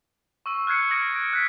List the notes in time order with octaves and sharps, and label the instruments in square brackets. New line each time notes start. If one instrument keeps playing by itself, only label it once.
[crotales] C#6 E6 D#7
F6 F#6 G#6 C7 C#7
D#6 G#6 A#6 C#7 D7
D7
F#6 B6